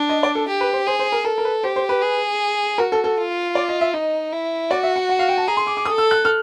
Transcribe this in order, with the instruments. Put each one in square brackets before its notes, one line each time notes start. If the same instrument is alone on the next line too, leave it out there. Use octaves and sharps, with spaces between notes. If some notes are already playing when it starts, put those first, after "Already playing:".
Already playing: [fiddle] D4
[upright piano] D#5
D5
A4
[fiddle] G4
[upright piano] B4
C5
[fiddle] G#4 [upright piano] C5
[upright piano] C5
A#4
[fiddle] A4 [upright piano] A#4
[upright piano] A#4
B4
[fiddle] G4 [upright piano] C5
[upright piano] C5
B4
[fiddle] G#4
[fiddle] F#4 [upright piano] A#4
[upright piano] A4
A4
[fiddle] F4
[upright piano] D5
D#5
E5
[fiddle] D#4 [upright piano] D#5
[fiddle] E4
[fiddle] F#4 [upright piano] D5
[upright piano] E5
F#5
F#5
F5
G5
A5
[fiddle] G#4 [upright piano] A#5
[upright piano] C6
D6
D6
[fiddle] A4 [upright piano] D#6
[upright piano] E6
F#6
F6